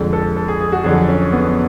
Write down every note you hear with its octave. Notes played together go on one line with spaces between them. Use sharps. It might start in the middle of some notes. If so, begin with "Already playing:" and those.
Already playing: F2 D3 G#3
A4
A4
G#4
G#4
F#4
F2 D3 F#3 G#4
C#4
B3